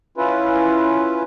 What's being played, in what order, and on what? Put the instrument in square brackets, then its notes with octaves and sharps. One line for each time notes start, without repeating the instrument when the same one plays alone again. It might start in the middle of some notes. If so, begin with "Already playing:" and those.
[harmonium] C#4 E4 F4 B4